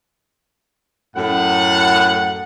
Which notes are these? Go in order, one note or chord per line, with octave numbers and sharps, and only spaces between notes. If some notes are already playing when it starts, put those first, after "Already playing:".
F#2 A2 F#5